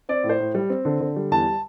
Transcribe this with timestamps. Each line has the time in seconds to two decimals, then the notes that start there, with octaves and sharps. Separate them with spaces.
0.09 C4 D5
0.24 A2
0.29 C5
0.40 A2
0.55 G3
0.70 C4
0.85 D3
1.00 D3
1.16 G3
1.31 E2 A5